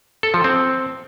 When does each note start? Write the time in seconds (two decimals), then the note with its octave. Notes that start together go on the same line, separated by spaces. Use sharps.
0.23 A4
0.34 F3
0.44 C4